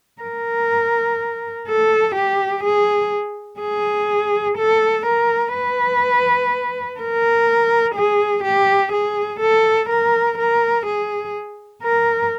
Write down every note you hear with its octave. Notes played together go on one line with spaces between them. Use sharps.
A#4
A4
G4
G#4
G#4
A4
A#4
B4
A#4
G#4
G4
G#4
A4
A#4
A#4
G#4
A#4